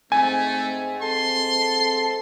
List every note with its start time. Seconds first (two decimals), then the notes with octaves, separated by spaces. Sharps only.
0.12 G#2 A3 C4 G#5
1.02 A4 C6